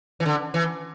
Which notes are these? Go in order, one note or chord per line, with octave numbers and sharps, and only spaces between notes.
E3
D3
E3